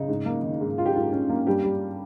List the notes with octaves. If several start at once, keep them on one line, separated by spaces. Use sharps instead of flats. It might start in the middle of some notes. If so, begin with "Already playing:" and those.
Already playing: C#3 D#4
G#2
A#3
D#3
G#2
C#4 F4
G4
G#2 F4
C#4
A#3
G2 G3 G4
G3